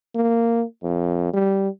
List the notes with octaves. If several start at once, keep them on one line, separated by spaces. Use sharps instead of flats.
A#3
F2
G3